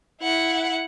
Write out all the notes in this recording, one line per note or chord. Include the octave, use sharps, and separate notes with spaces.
E4 F#5